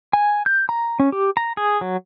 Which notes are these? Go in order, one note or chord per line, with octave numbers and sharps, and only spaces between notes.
G#5
G6
A#5
C#4
G4
A#5
G#4
F#3